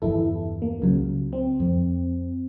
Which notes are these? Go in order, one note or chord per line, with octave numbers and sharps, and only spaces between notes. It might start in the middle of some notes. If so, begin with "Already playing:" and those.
G1 E2 E3 E4 A4
A#3
C#2 C#3 F#3
C4
F2